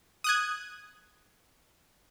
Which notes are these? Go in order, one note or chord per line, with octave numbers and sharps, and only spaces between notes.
D#6 F#6 G#6